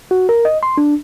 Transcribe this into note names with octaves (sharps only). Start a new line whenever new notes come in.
F#4
A#4
D#5
C6
D4